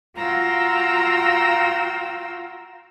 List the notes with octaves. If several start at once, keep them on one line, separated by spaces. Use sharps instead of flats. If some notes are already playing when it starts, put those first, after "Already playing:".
F4 F#4 F5 G5 A#5 E6